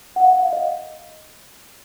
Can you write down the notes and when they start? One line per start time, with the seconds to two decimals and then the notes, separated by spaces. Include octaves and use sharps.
0.16 F#5
0.24 F5
0.33 F#5
0.42 F5
0.53 D#5